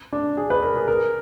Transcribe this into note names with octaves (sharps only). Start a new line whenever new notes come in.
D4
G#4
B4
A#4
G#4
A#4